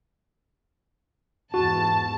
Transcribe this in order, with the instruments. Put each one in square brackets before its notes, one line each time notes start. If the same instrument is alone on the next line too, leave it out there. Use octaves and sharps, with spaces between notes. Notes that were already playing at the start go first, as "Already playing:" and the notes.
[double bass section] E2 G#2 [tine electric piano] F#4 [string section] A5